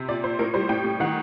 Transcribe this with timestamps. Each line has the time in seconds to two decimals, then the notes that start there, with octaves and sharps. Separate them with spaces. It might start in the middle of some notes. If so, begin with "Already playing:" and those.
Already playing: C3
0.08 A#2 D5
0.23 A#2 C5
0.39 A2 A#4
0.54 G3 C5
0.69 A2 G5
0.84 A2
1.00 D#3 F#5